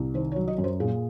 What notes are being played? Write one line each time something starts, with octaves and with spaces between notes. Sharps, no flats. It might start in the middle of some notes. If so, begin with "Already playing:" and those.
Already playing: C2
D#3 C5
C#5
F#3
D#5
F#2
C5
A#2 G#4